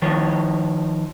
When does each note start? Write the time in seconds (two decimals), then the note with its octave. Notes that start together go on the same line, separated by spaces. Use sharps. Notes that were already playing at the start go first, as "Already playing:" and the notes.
0.02 D#3 F3 C#5